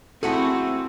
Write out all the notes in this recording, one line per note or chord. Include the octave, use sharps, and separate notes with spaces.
A3 C4 E4 F#4 G#4 A4